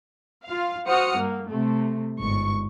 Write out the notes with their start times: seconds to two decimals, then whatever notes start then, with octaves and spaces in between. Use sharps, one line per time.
0.45 F4 F5
0.85 F#4 C5 F#5 D#6 F6 C#7
1.17 G2 A#3
1.48 C3 A3
2.20 G1 G#2 C#6